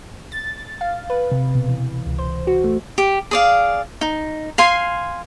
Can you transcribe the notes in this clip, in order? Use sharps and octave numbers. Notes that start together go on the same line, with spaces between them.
A6
F5
B4
C3
B2
E3
C#2
C5
F#4
A3
G4
G#4 D5 F5
D#4
F5 G#5 C6